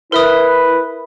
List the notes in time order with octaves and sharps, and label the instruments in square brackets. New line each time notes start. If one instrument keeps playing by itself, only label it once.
[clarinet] E4 [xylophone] A#4 E5 D#6 [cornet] B4